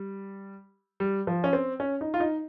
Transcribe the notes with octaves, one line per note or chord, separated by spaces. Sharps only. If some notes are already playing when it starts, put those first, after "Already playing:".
Already playing: G3
G3
F3
C#4
C4
C#4
D#4
F4
D#4